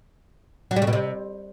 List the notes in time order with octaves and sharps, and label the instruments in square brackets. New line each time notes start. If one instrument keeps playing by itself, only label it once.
[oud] F#3
G3
C#3
B2
C3